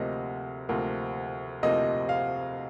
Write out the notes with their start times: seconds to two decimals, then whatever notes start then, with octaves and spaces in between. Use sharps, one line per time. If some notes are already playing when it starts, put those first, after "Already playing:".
Already playing: D2 C3 F3 A#3 D#5
0.69 D2 C3 F3 A#3
1.63 D2 C3 F3 A#3 D#5
2.09 F5